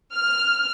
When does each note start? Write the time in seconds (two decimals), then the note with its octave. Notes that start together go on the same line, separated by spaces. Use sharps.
0.16 F6